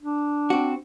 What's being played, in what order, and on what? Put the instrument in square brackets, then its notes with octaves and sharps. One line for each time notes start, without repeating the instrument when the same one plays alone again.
[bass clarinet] D4
[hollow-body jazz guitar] C4 F#4